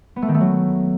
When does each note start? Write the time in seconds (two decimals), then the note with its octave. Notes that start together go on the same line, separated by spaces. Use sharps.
0.16 B3
0.22 A3
0.28 D#3
0.34 A3
0.41 F#3